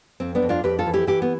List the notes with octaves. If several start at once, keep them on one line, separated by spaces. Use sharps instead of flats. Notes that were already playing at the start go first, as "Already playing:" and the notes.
F2 C4
B3 D4
F2
D4 F4
F2 G4 B4
F4 A4
E3
E4 G4
E3 E4 G4
B3